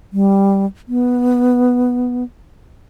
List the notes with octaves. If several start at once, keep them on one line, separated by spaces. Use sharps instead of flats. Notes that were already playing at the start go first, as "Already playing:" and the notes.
G3
B3